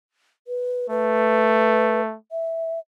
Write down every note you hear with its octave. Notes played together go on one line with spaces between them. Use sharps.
B4
A3 B4
E5